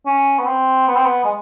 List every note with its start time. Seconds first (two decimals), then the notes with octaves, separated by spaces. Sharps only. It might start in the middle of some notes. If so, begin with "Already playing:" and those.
0.06 C#4
0.39 B3
0.47 C4
0.88 B3
0.96 C4
1.05 B3
1.24 G#3